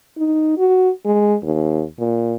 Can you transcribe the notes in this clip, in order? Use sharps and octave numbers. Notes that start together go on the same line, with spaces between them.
D#4
F#4
G#3
D#2
A#2